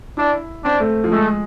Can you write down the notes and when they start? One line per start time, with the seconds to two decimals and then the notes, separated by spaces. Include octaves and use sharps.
0.17 D4 E4
0.64 C4 D4
0.80 A3
1.04 F3
1.12 G#3 A3